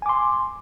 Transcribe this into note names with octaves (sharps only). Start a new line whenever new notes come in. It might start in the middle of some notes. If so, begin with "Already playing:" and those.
G#5 C6 D6